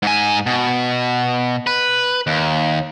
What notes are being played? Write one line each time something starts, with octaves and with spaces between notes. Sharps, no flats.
G#2 G#5
B2
B4
D#2